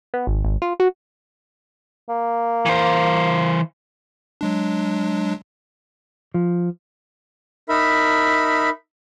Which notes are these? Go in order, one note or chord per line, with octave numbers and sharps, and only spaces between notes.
B3
G#1
G#1
F4
F#4
A#3
E3 C5
F#3 G#3 D4
F3
D#4 A#4 E5 B5